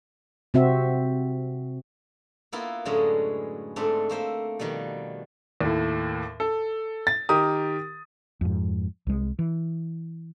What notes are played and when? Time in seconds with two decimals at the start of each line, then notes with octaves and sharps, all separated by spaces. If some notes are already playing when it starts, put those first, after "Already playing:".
0.54 C3 C4 F#4 E5
2.52 A#3 B3 E4 F4
2.85 F#2 A2 D3 G#3 C#4 D#5
3.76 G#2 A3 C4 D4
4.09 A3 A#3 C5 E5
4.59 B2 D#3 F3 G3
5.61 D#2 A2
6.40 A4
7.07 A6
7.29 D#3 G4 A#4 D#6
8.41 F2 G#2
9.07 C2 G#3
9.39 E3